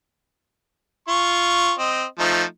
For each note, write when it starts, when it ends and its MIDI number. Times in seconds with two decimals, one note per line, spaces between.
1.08 1.72 65
1.08 1.72 85
1.79 2.04 60
1.79 2.04 75
2.19 2.43 53
2.19 2.43 57
2.19 2.43 63